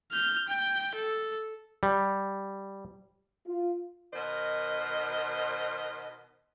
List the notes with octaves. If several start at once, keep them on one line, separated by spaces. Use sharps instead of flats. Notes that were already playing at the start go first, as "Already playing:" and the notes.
F6 G6
G5
A4
G3
F4
B2 D#3 A#4 C5 D#5